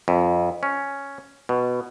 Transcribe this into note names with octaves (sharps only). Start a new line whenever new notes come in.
F2
C#4
B2